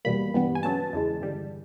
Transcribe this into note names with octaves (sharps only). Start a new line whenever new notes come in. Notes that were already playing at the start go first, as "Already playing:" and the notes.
E2 B2 G3 A#3 B5
G2 E3 G3 B3
G#5
C#3 F#3 B3 A5
E2 C#3 E3 G#3
G2 D3 G3